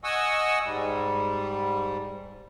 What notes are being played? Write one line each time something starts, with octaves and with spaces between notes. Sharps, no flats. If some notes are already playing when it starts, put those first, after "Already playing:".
D#5 F#5 G#5 C#6 D#6 E6
G#2 G3